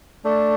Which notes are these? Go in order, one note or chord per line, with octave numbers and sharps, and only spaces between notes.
A3 D4